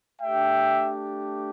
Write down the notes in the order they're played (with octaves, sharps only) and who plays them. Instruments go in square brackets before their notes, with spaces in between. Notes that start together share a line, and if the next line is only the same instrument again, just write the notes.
[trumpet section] A3 D4 G4 E5 G5